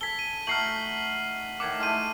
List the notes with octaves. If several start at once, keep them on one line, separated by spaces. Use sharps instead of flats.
A4 G#5 B6 G7
D#7
A3 D#4 F#4 F6 C7 F#7
A2 D#3 F#5 D6
G#3 A3 G4 F6 D#7